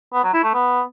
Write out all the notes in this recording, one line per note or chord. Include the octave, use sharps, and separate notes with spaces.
B3
F#3
E4
A3
B3